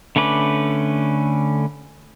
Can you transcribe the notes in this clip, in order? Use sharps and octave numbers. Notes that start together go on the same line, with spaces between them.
D3 A3 C#4 B4 D6